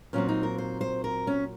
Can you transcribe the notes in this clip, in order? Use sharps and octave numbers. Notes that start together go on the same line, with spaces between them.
A#2 F#3 C4 C#4
D#4
A#4
C5
C5
A#4
C#4